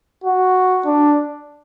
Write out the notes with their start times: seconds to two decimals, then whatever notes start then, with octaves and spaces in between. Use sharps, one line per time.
0.24 F#4
0.86 D4